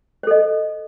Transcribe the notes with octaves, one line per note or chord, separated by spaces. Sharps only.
A4 C5 D#5